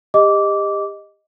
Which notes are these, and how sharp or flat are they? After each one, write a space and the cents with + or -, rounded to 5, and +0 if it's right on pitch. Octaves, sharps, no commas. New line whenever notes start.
G4 +30 D#5 +0 D6 -15